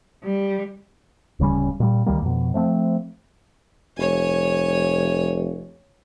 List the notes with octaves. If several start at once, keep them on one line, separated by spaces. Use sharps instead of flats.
G3
D1 C#3 G3 C#4
A#2 G3
C#2 D#3 G3 A#3
F2 B2
F3 A3 C4
F1 C#5 G#5